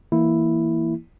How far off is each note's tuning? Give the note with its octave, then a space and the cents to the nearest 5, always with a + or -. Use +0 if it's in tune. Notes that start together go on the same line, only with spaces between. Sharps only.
E3 +0 A#3 +0 E4 +0